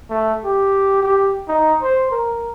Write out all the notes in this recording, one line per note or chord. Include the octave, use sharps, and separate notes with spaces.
A3
G4
G4
D#4
C5
A#4